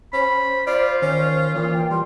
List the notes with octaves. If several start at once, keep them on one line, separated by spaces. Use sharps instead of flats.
C#4 C5 B5
F4 D5
D#3 C#4
A#2 E3
G5
E3 G3 C6